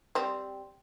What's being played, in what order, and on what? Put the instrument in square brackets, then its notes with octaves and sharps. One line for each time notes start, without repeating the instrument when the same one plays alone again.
[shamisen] G3 C4